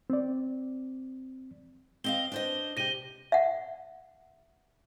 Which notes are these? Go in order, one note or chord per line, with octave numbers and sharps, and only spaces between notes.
C4 D5
C4 D#5 F5 G7
D4 C5 D#5
C3 G4 A#6 D#7 G7
E5 F#5